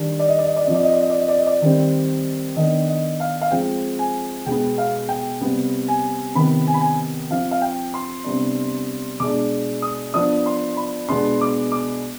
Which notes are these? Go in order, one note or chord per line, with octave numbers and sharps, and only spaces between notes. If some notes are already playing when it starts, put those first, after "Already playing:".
Already playing: D#3 G3 D4
D5
D#5
D5
D#5
D5
F3 C4 D#5
D5
D#5
D5
D#5
D5
D#5
D5
D#5
D5
D#3 G3 C4
D#3 B3 D4 D#5
D#5
F5
F5
F3 G#3 C4 G5
G#5
B2 G#3 B3 G5
F5
G5
C3 G3 B3
G#5
C3 D#3 B3 B5
G#5
B5
G#5
F3 C4 F5
F5
G5
C6
C3 G3 B3 D4
B2 G#3 D4 D6
D#6
F3 B3 D4 D#6
C6
B5
B2 G#3 B3 D4 C6
D6
D6